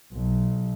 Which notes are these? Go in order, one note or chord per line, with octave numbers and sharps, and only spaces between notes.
B1